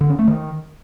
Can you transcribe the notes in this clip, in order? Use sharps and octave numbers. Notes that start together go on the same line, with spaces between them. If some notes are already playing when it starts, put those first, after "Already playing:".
D3
C#4
A3
D#3